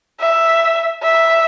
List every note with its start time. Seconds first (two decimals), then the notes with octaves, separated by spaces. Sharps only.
0.21 E5
1.03 E5